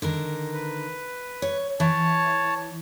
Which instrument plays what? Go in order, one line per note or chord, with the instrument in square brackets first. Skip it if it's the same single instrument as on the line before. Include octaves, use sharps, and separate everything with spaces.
[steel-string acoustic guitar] D3 D#3 A#4
[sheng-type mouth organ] B4
[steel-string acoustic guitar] C#5
[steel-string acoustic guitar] E3 [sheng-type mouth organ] C#5 A5